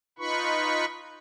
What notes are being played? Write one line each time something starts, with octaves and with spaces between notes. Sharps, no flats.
D#4 F4 B4 B5 C#6